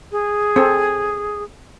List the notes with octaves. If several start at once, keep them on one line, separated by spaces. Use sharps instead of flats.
G#4
C4 A4